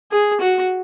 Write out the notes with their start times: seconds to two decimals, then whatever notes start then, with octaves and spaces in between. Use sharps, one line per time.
0.11 G#4
0.41 F#4